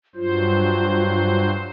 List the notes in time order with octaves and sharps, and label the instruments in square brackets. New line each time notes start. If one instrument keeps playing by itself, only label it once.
[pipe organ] G2 F#3 C5 [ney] F4